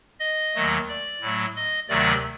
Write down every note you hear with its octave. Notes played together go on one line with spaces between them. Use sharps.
D#5
D#2 D#3 F#3 A3
D5
A2 F#3 A3
D#5
D2 C3 D#3 F#3 A3 D5